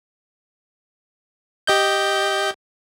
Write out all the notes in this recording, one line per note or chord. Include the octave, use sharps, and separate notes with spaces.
G4 D#5 G6